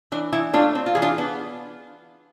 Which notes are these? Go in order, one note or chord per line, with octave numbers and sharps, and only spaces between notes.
E3 D4
E3 E4
A3 D4 F4
C4
F4
E3 G#4
D4 F4
B3 D4